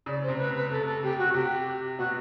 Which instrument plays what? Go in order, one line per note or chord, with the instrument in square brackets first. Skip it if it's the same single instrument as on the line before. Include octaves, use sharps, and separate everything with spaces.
[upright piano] C#3 [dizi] D5
[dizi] C5
[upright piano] C3
[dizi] B4
[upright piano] C3
[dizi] B4
[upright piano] C3 [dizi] A4
[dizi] A4
[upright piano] C3 [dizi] G4
[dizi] F#4
[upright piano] C3 [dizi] G4
[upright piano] B2 [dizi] F#4